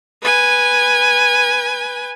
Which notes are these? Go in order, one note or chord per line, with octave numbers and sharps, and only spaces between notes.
B4 G#5